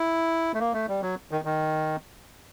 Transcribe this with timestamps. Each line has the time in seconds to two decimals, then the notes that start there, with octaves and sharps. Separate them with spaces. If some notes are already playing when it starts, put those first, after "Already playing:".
Already playing: E4
0.54 A3
0.60 A#3
0.73 A3
0.88 G3
1.02 F#3
1.31 D#3
1.45 D#3